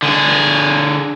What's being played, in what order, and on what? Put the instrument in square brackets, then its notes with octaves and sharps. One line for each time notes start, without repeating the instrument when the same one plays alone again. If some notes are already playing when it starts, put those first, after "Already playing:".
[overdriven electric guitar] D3 G#4